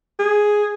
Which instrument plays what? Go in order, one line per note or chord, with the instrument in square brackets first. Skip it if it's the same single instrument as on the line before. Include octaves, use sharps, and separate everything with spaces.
[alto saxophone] G#4